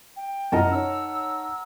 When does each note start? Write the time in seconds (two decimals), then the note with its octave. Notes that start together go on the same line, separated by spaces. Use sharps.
0.16 G5
0.52 F#2 E4 A#4 D#5 F#5 A5
0.72 D#4 C#5 E6